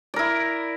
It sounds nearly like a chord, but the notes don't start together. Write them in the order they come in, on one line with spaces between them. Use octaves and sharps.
D5 A#4 E4